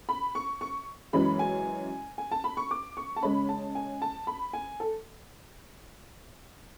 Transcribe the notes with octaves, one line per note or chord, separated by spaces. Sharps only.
B5
C#6
C#6
F#2 E3 G#3 C#4 B5
G#5
G#5
A5
B5
C#6
D6
C#6
A5
C#3 G#3 C#4 B5
A5
G#5
A5
B5
G#5
A4